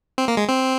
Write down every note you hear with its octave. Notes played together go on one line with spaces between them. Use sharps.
C4
A#3
G#3
C4